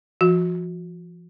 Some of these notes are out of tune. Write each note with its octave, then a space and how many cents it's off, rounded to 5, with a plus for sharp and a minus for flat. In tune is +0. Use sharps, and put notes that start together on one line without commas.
F3 -30 F#4 -30